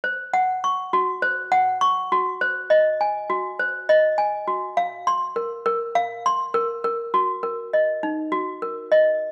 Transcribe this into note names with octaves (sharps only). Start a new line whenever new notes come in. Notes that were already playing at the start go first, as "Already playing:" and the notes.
C5
F#5
C#6
F#4
C5
F#5
C#6
F#4
C5
D#5
G#5
F#4
C5
D#5
G#5
F#4
F5
C6
A#4
A#4
F5
C6
A#4
A#4
F#4
A#4
D#5
D#4
F#4
A#4
D#5